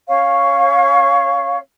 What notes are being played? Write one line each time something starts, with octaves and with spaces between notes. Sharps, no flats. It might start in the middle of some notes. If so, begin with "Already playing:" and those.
C#4 C#5 F5 C#6